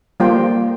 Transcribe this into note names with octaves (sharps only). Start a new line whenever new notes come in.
G3 A#3 F4 C5 G5